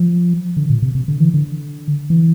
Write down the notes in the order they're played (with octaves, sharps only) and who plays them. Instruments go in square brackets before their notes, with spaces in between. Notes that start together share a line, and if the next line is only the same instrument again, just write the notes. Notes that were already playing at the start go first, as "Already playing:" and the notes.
Already playing: [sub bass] F3
D3
A#2
C3
C3
D3
E3
D3
E3